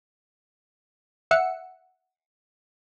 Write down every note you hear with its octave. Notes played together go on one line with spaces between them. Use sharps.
E5 F#5 E6 C#7